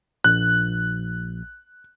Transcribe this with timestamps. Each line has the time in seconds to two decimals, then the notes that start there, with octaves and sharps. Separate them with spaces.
0.24 A#1 F#6